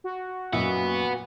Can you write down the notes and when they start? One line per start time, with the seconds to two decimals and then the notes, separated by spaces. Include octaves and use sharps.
0.04 F#4
0.53 F#2 A#2 B4 D#5 E5 F#5